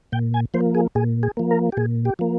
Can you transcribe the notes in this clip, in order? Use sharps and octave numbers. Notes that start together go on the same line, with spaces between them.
A#2 G5
G#5
F3 A#3 C5
G#4
A#2 G#4
G#4
F3 A#3
A#4
G4
A#2 G#4
G4
F3 A#3